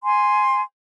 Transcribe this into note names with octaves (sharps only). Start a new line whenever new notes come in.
G#5 C6